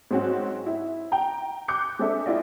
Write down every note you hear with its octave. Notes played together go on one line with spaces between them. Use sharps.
G#2 F#3 C4 C#4 F#4
E4
G5 A#5
D6 F#6 G6 C#7
G#3 C4 D4 A4 E5
E4 F4 D5 D#5